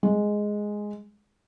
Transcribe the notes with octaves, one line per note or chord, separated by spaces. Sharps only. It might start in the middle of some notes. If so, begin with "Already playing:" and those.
G#3